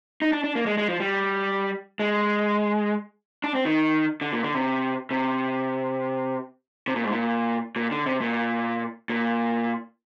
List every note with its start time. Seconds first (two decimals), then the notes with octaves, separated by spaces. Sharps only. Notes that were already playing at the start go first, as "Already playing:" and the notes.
0.22 D#4
0.33 D4
0.44 D4
0.55 A#3
0.66 G#3
0.78 G#3
0.88 F3
1.00 G3
1.99 G#3
3.44 D4
3.55 C4
3.65 D#3
4.21 D3
4.33 A#2
4.43 D3
4.55 C3
5.11 C3
6.87 C3
6.96 A#2
7.04 G#2
7.11 A#2
7.76 A#2
7.91 D3
8.06 C3
8.21 A#2
9.10 A#2